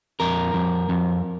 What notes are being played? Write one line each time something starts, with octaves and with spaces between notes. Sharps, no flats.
F2 A#4
F2
F2